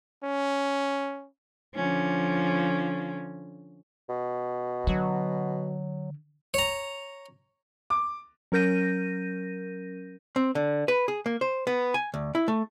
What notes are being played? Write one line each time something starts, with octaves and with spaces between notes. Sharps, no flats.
C#4
D3 F3 C#4
B2
D3 F#3
C#5 A#5
D6
F#3 C#4 A#4 G6 A#6 D#7
C4
D3
B4
G#4
A#3
C5
B3
G#5
D2
E4
A3